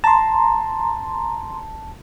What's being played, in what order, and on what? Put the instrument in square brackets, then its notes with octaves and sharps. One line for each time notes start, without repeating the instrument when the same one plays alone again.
[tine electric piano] A5 [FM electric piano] A#5 C6